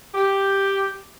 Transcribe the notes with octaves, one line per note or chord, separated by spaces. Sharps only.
G4